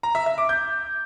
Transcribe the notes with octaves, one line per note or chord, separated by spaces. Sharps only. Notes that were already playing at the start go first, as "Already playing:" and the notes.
A#5
E5
E5
D6
G6